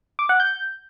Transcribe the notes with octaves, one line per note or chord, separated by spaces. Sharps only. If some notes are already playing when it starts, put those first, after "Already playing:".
D6
F#5
G6